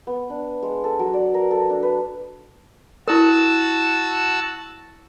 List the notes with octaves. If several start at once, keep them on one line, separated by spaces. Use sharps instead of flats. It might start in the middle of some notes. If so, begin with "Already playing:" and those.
B3
D4
G#3
A4
F#3
D5
A#4
A4
D4
B4
E4 F#4 A#4 A5 E6